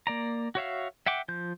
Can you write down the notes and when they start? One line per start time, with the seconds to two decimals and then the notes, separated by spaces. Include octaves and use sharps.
0.07 A#3 D5 A#5
0.55 F#4 C#5 E5 F5
1.06 E5 F#5 G5 D6
1.28 F3 G6